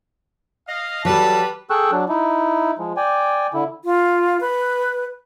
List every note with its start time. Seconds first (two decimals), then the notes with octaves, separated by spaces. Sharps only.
0.68 D#5 F5
1.05 F#3 G3 A4 B4 A5
1.70 G#4 A4 G5 C#6 E6 F#6
1.92 F#3 D4
2.09 D#4 E4
2.79 F3 G#3
2.97 D5 G5 G#5
3.54 D3 E4
3.85 F4
4.41 B4